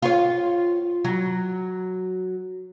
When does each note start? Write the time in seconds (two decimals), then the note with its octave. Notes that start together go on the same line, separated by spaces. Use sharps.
0.02 F4 C#5
1.04 F#3